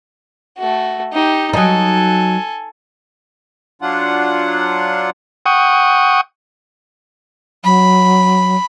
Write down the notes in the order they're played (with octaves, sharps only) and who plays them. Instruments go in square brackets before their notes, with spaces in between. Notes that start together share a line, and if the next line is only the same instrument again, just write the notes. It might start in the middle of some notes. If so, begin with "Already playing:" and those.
[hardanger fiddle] A3 F#4
D#4 G4
[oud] F#3 D#4 [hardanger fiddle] A4 G#5
[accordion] F#3 D4 F4 F#5
[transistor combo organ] F#5 G5 C#6 D#6
[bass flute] F#3 [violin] B5